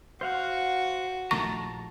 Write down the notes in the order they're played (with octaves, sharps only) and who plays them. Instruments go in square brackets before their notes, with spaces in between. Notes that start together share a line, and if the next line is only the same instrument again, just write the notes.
[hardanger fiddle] F#4 [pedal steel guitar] C5 F5 F#5
[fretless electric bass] A#1 D#3 A3 [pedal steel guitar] A5 A#5 [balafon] C#6